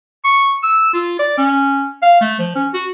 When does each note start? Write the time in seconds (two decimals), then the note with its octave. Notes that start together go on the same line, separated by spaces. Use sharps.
0.24 C#6
0.63 E6
0.94 F4
1.19 D5
1.38 C#4
2.02 F5
2.21 A3
2.39 F3
2.55 C#4
2.74 F#4